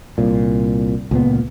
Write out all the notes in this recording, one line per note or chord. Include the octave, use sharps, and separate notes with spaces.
C2 A#2
C#2 A#2 B3